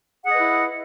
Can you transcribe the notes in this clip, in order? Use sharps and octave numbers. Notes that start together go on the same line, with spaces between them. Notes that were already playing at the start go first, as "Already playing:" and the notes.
E4 G#4 B4 D#5 F#5